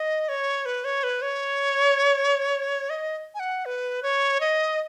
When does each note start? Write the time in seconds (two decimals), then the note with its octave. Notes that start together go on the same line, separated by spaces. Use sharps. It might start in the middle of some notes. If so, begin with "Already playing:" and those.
Already playing: D#5
0.29 C#5
0.66 B4
0.85 C#5
1.03 B4
1.22 C#5
2.90 D#5
3.35 G#5
3.40 F#5
3.65 B4
4.03 C#5
4.41 D#5